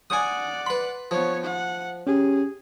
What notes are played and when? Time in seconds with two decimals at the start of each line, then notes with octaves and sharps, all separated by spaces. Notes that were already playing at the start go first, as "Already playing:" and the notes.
0.10 D5 F#5 G#5 D#6
0.66 B4 B5 C6
1.11 F3 B3 C#5
1.44 F#5
2.07 C#4 G4 G#4